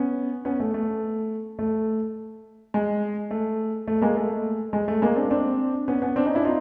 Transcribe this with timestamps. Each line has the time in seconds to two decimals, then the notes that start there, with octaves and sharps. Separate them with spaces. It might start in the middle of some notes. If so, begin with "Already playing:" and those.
Already playing: B3 C#4
0.45 B3 C#4
0.60 A3
0.74 A3
1.59 A3
2.74 G#3
3.31 A3
3.88 A3
4.02 G#3 A#3
4.17 A3
4.73 G#3
4.88 A3
5.02 G#3 A#3
5.16 C4 D4
5.31 C4 D4
5.88 B3 C#4
6.02 B3 C#4
6.16 C4 D4
6.26 C#4 D#4
6.35 D4 E4
6.45 D#4 F4